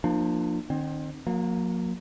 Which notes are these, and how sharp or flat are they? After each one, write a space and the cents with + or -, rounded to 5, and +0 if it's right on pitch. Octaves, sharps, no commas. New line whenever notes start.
F3 +0 A#3 +0 D4 +40
D#3 -35 C4 +20
F#3 -45 A#3 +0